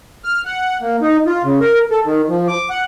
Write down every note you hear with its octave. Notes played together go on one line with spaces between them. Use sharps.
F6
F#5
A#3
D#4
F4
C#3
A#4
A4
D#3
F3
D6
F#5